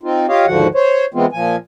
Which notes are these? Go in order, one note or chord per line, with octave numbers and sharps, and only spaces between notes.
C4 D#4 F4
F4 G4 C#5 D#5 F5
D#2 G#2 D3 F3 F#4 F#5
C5 C#5
E3 G#3 B3 C4 F4
A#2 F3 G#5